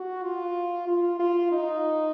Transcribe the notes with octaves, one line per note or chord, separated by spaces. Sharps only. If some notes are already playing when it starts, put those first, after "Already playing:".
Already playing: F#4
F4
F4
F4
D#4